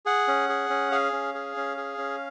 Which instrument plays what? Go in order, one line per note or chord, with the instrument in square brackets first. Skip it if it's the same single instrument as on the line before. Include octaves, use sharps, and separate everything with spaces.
[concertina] G#4 F#5
C#4
G#4
C#4
G#4 F5
C#4
G#4
C#4
G#4
C#4